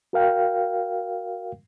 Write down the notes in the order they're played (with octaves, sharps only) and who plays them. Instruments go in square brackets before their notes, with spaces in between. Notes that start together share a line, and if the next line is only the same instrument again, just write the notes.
[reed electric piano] F#4 A#4 F5 G5